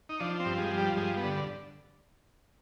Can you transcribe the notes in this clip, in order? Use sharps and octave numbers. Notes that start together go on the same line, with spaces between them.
D#4
F3 D4
C4
G2
G#3
F3
G3
G2 G#3
B3
D3